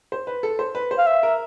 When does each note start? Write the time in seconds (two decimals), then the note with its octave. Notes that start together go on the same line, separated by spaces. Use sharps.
0.12 C5
0.27 B4
0.43 A4
0.59 C5
0.75 B4
0.91 C5
0.98 F5
1.06 E5
1.23 A#4